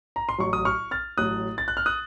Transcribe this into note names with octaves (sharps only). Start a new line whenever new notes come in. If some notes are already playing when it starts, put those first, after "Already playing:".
A#5
C6
A1 A2 F#3 C#6
D#6
C#6 F6
F6 A6
A1 A2 F#3 D#6 F#6
A6
F#6
F6
D#6 F#6